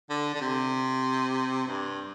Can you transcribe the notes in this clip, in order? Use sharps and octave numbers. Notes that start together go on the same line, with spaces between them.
D3
D3
C3
G2